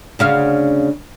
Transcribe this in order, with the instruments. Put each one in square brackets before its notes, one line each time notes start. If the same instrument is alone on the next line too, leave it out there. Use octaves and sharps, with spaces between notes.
[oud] D2 C#3 F5